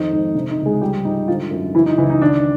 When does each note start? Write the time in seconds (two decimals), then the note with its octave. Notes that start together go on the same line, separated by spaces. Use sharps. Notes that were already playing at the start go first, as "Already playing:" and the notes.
Already playing: F2 D#3 D#4
0.11 G#2
0.35 C3 D4
0.50 D#4
0.58 C#2
0.66 G#3 G#4
0.81 F3 G3 G4
1.05 G#2 D#4
1.28 D3 F3 F4
1.51 F#2
1.75 C#3 E3 E4
1.86 D#4
1.98 C#2 E3 E4
2.10 D#4
2.22 D#3 D4